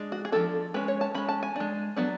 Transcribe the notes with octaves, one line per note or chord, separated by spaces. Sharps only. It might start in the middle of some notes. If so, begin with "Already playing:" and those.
Already playing: G#3 D4
F#4
G#4
F3 A3 D4 A4
G#3 C#4 B4
C#5
A5
G#3 C#4 B5
A5
G#5
G#3 D4
F#3 B3 D4